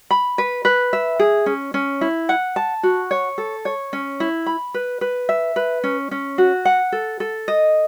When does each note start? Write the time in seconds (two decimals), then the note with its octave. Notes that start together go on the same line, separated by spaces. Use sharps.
0.11 B5
0.38 B4
0.65 B4
0.93 E5
1.19 G#4
1.46 C#4
1.74 C#4
2.01 E4
2.29 F#5
2.56 A5
2.83 F#4
3.11 C#5
3.38 A4
3.65 C#5
3.93 C#4
4.20 E4
4.46 B5
4.74 B4
5.01 B4
5.29 E5
5.56 B4
5.84 C#4
6.11 C#4
6.38 F#4
6.65 F#5
6.92 A4
7.20 A4
7.48 D#5